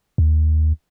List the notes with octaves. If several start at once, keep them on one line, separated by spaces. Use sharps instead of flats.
D#2